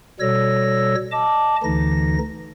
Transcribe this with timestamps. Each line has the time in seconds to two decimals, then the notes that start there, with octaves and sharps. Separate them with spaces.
0.20 B2 G3 A4 C#5 E6 A#6
1.11 D#5 A5 D6
1.64 D2 D3 E3 D#4 A#6